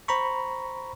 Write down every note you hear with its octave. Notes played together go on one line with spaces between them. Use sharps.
C5 A#5 B5 C#6